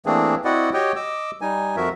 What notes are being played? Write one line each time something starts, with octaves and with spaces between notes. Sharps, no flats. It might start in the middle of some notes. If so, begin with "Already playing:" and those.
E3 A3 A#3 C4 D4 G#4
C4 E4 F#4 D5 D#5 F#5
F#4 G4 C#5 D#5 G5
D#5 D6 E6
G3 D#4 G#5
F2 F3 F#4 A#4 E5